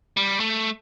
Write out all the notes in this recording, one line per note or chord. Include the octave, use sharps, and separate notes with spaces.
G3
A3